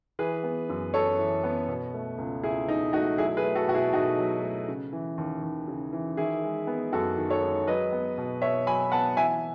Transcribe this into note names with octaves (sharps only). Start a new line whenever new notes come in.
E3 G#4 B4
B3
F#2
F#2 A4 C#5
E3
B3
B2
A3
C#2
C#2 E4 G#4
B2 D#4
A3 D#4 F#4
F#3 E4 G#4
G#4 B4
A3
F#4 A4
B2 F#4
E4 G#4
B2 D#4 F#4
F#3
A3
C#3
E3
D#2
D#2
C#3
E3
D#3 E4 G#4
G#3
B3
F#2 F#4 A4
D#3
A4 C#5
G#3
F#3 B4 D#5
B3
B2
B2 C#5 E5
F#3 G#5 B5
B3 F#5 A5
E3 E5 G#5